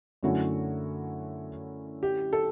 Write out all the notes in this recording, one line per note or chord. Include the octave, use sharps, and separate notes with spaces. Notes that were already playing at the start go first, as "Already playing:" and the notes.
F#2 D3 A3 C#4 E4 F#4
G4
A4